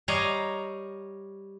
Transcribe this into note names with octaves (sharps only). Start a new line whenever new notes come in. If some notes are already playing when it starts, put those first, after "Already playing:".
G3 C#5 D#5 F5 A#5